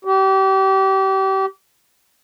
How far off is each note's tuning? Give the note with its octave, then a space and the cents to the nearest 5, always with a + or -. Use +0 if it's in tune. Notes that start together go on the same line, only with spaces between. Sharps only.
G4 -30